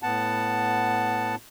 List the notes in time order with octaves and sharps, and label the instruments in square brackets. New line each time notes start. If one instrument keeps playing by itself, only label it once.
[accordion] A2 B3 F#5 A5